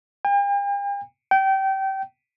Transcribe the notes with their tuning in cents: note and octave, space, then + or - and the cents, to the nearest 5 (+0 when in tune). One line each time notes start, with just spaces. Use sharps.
G5 +45
G5 -25